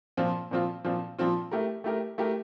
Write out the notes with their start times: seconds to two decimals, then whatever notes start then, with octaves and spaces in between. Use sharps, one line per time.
0.17 A#2 F3 C4 F4
0.51 A#2 F3 C4 F4
0.84 A#2 F3 C4 F4
1.18 A#2 F3 C4 F4
1.51 A3 E4 G4 A#4
1.84 A3 E4 G4 A#4
2.18 A3 E4 G4 A#4